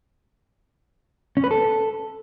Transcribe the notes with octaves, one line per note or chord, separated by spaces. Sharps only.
C#4
B4
A4